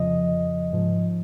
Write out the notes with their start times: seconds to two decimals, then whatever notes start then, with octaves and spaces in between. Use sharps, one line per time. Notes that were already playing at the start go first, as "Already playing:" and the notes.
Already playing: F2 C#3 F3 D#5
0.73 G#2 F3